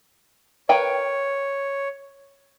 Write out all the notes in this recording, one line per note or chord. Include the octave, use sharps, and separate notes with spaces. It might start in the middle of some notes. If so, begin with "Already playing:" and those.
A#4 B4 C#5 G5